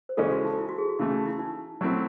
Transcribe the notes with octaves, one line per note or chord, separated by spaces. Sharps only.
C5
C#3 E3 G#3 C#4 G#4 A4
F#4
D#4
E4
F#4
G#4
F#4
C#3 E3 A3 E4
D#4
E4
D#4
F#3 A3 C4 E4